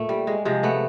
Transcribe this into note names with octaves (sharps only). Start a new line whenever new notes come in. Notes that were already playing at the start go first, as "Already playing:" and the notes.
Already playing: A#2 A3
G3
G#3
C3 F3 G#3
A3 B3